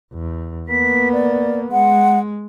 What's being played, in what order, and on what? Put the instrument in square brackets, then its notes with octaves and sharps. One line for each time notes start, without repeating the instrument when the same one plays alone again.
[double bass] E2
[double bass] A#3 B3 [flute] B6
[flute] D5
[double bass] G#3 [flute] F#5